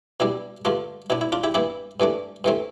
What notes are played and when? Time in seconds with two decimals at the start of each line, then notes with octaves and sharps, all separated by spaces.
0.20 B2 G3 D4 E4
0.65 G2 D3 A3 D4 F4
1.10 B2 B3 D4 E4
1.21 E4
1.32 D4 F4
1.44 E4 G4
1.54 G2 E3 B3 E4 G4
2.00 G2 E3 A3 D4
2.44 G2 E3 A3 C4